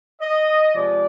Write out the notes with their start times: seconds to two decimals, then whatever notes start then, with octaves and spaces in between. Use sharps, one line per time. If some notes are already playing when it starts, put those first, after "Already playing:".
0.21 D#5
0.75 C3 F3 G#3 D5